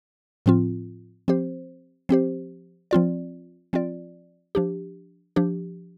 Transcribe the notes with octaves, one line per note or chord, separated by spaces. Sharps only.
A2 F3 C4 F4
F3 C4 G4 C5
F3 C4 G4 C5
F3 C4 F4 D5
F3 C4 F4 D5
F3 D4 G4
F3 D4 G4